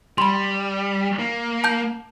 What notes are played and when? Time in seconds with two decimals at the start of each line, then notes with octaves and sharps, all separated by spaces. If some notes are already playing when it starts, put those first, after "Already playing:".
0.18 G3 B5 C6
1.19 A#3
1.64 A5 G6